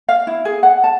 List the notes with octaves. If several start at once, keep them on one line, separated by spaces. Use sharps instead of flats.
F5
E4
G#4
F#5
A5